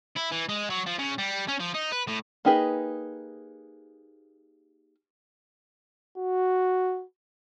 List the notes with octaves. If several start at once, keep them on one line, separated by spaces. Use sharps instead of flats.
E4
E3
G#3
F#3
F3
C#3
G3
C#4
F3
D#4
B4
A2
A#3 D#4 G4 G#4 B4
F#4